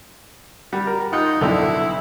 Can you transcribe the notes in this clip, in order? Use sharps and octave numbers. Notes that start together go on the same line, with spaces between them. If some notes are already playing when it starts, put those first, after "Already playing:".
G3 F#5
A#4
D#4 F4 F#5 G5
B1 F2 D3 E4